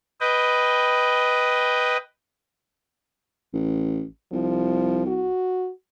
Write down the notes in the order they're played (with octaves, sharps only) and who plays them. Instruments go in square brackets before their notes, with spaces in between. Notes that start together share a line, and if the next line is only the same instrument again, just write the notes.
[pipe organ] B4 D#5 G5
[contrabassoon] A1
[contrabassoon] C2 [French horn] F3
[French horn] F#4